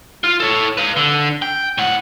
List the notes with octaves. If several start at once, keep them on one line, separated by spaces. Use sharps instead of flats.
F4
A4 C#5
B4 F5
D3
G5
A2 F#5